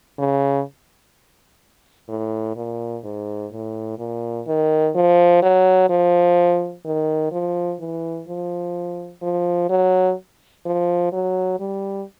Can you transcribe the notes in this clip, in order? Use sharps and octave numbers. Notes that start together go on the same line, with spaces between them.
C#3
A2
A#2
G#2
A2
A#2
D#3
F3
F#3
F3
D#3
F3
E3
F3
F3
F#3
F3
F#3
G3